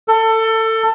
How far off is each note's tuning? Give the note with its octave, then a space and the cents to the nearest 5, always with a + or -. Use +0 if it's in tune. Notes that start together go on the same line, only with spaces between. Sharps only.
A4 +25